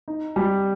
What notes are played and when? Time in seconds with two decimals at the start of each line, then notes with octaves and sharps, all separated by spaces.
0.08 D#4
0.36 G3